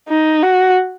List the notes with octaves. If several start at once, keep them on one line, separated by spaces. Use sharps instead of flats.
D#4
F#4